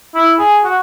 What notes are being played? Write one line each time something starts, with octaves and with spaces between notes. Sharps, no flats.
E4
G#4
F#4